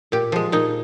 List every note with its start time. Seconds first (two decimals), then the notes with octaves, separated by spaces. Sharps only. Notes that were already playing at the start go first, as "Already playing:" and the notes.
0.12 A#2 G4
0.32 F3 G#3
0.52 A#2 D#4